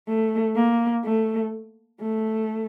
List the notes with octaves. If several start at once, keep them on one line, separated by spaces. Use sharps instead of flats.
A3
A#3
A3
A3